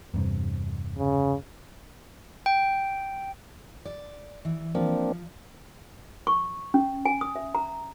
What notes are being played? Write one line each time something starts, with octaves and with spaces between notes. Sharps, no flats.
E2 G2 C3
C#3
G5
D5
E3
F3 A#3 C4 D4
C#6
C#4
G#5
D#6
E5
A#5